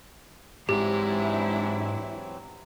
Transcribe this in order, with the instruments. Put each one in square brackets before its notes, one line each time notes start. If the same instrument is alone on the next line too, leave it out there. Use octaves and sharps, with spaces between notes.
[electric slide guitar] G#2 G#3 [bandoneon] E3 F#3 C4 [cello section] D4 E4 [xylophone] G4